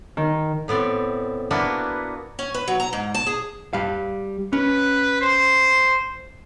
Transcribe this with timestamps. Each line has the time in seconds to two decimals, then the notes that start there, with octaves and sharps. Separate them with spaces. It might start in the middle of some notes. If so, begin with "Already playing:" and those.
0.17 D#3
0.68 A2 B3 C4 D5
1.51 A#3 B3 D4 E4 F#4 B4
2.39 C#4
2.54 B4
2.68 F#3
2.80 A#5
2.93 G#2
3.14 A5
3.27 G#4
3.73 G3 F5
4.53 C#4 B4
5.21 C5